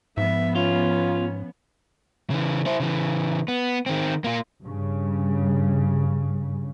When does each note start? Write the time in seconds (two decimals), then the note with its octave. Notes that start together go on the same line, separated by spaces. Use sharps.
0.17 G#2 F3 B3 E5
0.55 C#4 F4
2.30 C#3 E3
2.66 E4 C5
2.80 C#3 E3
3.48 B3
3.86 D#3 C4
4.24 A#3 F4
4.62 G2 C#3